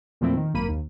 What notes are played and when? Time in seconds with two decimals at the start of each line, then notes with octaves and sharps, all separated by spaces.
0.21 E2 A#2 F3 A3 C4 E4
0.37 D#3
0.54 G#1 F#2 A#3 B5 D#7
0.68 D#2